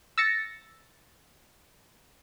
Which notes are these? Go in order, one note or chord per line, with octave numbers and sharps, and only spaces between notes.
E6 A6 A#6 C#7